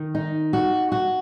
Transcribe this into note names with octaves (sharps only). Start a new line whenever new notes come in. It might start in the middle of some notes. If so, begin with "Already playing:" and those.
Already playing: D#3
D#4
F#4
F#4